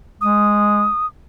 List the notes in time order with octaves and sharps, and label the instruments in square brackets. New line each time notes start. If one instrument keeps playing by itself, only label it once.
[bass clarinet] G#3 [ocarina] D#6